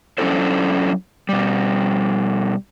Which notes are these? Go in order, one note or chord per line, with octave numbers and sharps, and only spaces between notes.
F#3 C#4 D4 E4 A4 C5
B2 G3